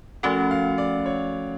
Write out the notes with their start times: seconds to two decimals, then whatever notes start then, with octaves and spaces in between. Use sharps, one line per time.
0.23 F3 A3 C#4 F#4 A4 F#5
0.51 F5
0.78 D5
1.06 C#5